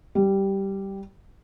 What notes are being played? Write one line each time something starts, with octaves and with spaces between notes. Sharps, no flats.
G3